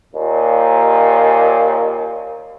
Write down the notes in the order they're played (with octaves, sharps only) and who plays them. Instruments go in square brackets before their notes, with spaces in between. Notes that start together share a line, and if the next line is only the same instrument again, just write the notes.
[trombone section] D#2 A#2